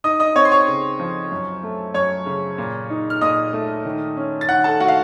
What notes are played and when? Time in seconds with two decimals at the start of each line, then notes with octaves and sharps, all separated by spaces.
0.04 D#4 D#5 D#6
0.20 D#5 D#6
0.36 C4 C#5 C#6
0.45 C6
0.52 C#5 C#6
0.68 C#3
0.99 F3
1.31 F#2
1.63 A3
1.94 F#2 C#5 C#6
2.26 C#3
2.58 A#2
2.90 D#4
3.10 F6
3.21 A#2 D#5 D#6
3.53 A3
3.85 D#3
4.17 C#4
4.41 A6
4.49 D#3 F#5 F#6
4.64 A4 A5
4.80 A3 F#4 F#5
4.88 F5